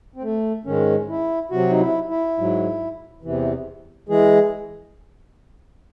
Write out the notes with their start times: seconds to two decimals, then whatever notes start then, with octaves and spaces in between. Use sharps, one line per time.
0.16 C4
0.23 A3
0.65 G#2 D#3 G#3 C#4
1.09 E4
1.51 C3 F#3 F#4
1.70 D#4
1.79 E4
2.09 E4
2.38 G#2 F#3
3.22 E2 C3 E3
4.09 E3 G#3 G#4